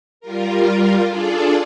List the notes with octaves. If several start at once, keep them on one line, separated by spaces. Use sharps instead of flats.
G3 F4 A#4
D4 F4 G#4 A4 D5